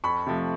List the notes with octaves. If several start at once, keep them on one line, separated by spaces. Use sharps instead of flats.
F2 B5 C#6
C3 F3 A3